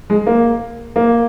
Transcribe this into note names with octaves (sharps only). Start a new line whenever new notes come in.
G#3
A#3
A#3